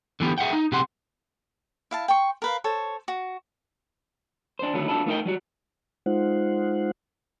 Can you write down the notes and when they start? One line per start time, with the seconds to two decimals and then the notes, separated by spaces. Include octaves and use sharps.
0.20 D3 E3 B3 G4
0.38 G#4 E5 F#5 G5
0.53 D#4
0.72 C3 G4 G#4 F#5 C6
1.91 E4 F5 A5
2.08 G5 C6 C#6
2.42 A#4 B4 F5
2.64 A4 C5 C#5
3.08 F#4
4.59 D4 C5
4.74 D3 D#3 F#3 A3 B3
4.88 D4 F4 F#4 A4 B4
5.06 A3 B3 D#4 E4 A#4 G5
5.25 F#3 G3 F#4
6.06 G#3 D#4 F4 C5 F#5